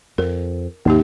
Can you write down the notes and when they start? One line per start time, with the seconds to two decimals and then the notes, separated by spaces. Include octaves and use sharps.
0.18 F2 A#4
0.85 D#2 G#2 C3 A#3 D#4 G4